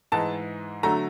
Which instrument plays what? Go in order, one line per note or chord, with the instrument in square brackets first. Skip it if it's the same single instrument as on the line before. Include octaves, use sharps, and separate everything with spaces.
[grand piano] G#2 E3 G#3 A5
D3 F#3 A3 A#5